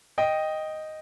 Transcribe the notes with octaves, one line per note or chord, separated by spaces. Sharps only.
D#5 G5